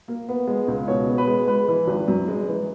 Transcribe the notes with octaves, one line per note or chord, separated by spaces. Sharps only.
A#3
B3
G#3
C#2
B2 C#5
B3
B4
G#3
G#3 B4
E3
G#1
F#2
G#3
E3